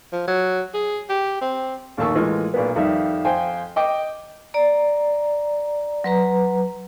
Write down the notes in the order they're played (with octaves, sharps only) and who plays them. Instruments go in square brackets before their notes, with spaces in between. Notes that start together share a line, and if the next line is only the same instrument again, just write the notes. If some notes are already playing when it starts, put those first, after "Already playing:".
[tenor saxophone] F3
F#3
G#4
G4
C4
[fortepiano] A#1 D#2 A3 A5 C#6 E6
A2 E3 G#3 A#3 F4
B1 A#2 B3
F2 D#3 G3 E5 F5
F2 C5 G5 G#5
D#5 G5 D6
[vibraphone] D5 A#5
F#3 B4 A#5